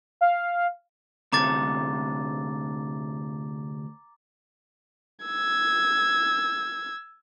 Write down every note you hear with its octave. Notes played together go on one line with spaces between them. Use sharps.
F5
D2 C3 A4 A#5 D6 A6
E6 G#6